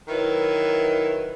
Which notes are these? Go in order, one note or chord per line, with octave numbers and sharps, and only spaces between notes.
D#3 F#3 E4 B4